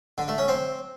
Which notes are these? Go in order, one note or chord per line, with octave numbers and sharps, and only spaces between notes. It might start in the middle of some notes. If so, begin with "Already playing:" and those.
D3
A3
C#4
C4